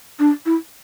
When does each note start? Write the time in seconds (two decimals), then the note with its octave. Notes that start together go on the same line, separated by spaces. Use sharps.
0.20 D4
0.46 E4